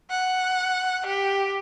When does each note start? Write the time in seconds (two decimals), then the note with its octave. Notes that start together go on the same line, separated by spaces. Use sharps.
0.10 F#5
1.06 G4